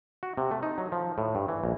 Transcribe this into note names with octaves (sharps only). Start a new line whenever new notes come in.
F#4
C3
A3
D#4
F#3
F3
A2
G2
E3
A#1